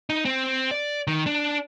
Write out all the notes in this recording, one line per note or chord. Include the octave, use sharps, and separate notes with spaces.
D#4
C4
D5
D#3
D4